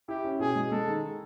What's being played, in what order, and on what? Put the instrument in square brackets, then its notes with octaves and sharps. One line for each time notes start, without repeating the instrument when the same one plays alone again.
[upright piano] E4 [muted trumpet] G4
[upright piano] C#4
[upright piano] B2 [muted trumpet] G#4
[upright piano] G#3
[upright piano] G#3 [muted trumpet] A4
[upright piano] D#3